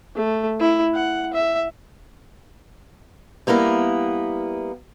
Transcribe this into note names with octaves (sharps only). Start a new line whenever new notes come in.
A3
E4
F#5
E5
G3 A#3 B3 E4 A#4